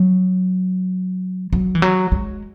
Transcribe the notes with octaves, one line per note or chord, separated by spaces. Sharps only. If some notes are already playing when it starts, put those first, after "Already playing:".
Already playing: F#3
F#3
E3
F#3
G#3